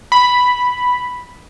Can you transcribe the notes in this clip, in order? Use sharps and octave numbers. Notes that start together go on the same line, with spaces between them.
B5